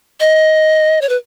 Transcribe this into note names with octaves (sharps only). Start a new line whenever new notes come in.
D#5
C#5
B4